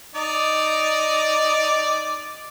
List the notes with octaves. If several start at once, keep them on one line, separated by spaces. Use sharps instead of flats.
D#4 D5 D#5